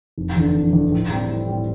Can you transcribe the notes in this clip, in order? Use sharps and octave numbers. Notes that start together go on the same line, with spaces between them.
F1
E2 D3
F1
E2 D3
A2
G3 C4
A2
G3 C4